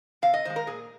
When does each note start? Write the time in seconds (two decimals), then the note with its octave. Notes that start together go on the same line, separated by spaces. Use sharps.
0.22 C3 F5
0.34 D#5
0.45 D#3 G#3 C5
0.56 A#4
0.67 A#2 G#4